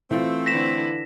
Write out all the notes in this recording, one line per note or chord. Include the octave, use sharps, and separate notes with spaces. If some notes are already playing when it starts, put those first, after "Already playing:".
E3 A3 C4 F4
D3 E4 B4 A#6 B6 E7